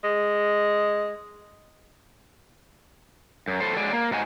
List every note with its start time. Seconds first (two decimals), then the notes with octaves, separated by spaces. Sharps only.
0.04 G#3
3.48 F#2
3.60 A2 A4 C5
3.76 F#3 G#3 D5
3.93 A#3
4.11 G#2 D#4 F#4 G#5